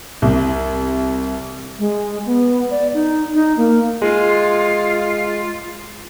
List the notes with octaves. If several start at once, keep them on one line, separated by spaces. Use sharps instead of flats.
C2
G#3
B3
D5
D#4
D#4
A#3
G#3 F4